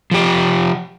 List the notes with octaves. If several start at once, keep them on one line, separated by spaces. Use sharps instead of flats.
F3 G4